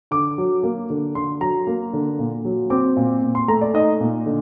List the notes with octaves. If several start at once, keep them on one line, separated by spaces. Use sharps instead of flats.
D3 D6
F#3
A#3
D3
D3 C6
F#3 A#5
A#3
D3
A#2
F#3
C4 D6
A#2
A#2
C6
A3 A#5
D5
D#4 D#5
A#2
D3